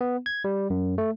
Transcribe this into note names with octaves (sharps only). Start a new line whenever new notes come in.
B3
G#6
G3
F#2
A3